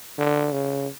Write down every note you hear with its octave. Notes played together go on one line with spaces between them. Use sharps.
D3
C#3